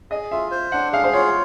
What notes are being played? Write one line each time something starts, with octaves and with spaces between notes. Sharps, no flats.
G#4 D#5
F4 E5
C5
D4 F#5
G#4 F5
C5
F4 C#5